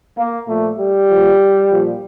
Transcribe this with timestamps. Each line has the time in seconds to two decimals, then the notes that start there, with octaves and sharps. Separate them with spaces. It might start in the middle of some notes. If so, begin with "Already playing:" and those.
0.17 A#3
0.48 A#2 F3 A3
0.79 G3
1.10 A#2 F3
1.72 A#2 F3